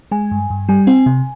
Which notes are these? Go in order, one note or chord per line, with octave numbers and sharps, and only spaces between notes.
G#3 G#5
G2
G2
G3 G#5
C4
C3